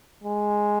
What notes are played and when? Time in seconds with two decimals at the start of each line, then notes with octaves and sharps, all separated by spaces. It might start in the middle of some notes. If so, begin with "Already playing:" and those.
0.24 G#3